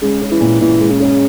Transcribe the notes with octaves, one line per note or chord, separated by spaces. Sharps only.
C#3 G#3
C#4
E3
A#2
A#2 E3
G#3
C#3
C#4